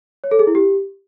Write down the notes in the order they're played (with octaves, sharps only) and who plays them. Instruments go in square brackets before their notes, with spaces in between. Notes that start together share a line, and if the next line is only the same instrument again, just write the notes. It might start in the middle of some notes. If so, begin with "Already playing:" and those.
[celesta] C#5
A4
G#4
E4
G4